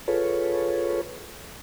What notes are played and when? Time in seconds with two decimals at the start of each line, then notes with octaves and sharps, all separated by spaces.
0.08 F4 G#4 A4 B4 C#5